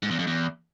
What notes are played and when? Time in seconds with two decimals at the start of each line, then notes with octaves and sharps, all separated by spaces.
0.03 G#2
0.11 E2
0.19 F2
0.27 E2